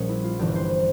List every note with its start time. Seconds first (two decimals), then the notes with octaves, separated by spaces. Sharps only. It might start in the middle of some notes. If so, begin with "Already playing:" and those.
Already playing: A#1 A#2 G3 C#4 G#4
0.09 E4
0.24 F4
0.39 G1 G2 E3 G4
0.55 C5